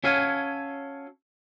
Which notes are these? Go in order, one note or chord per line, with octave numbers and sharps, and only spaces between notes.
C#4 F#4 A4 C#5 F5 G#5